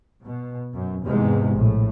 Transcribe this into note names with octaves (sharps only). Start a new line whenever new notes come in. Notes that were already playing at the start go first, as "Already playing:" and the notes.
B2
F#2
E2 G#2 C3 G#3
A#1 A2